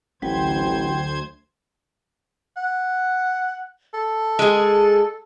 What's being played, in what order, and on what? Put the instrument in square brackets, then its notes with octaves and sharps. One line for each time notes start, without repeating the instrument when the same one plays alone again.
[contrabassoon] A1 [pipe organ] D2 C5 G#6 [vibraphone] F#3 G5
[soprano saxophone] F#5
A4
[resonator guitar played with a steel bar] G#3 G#4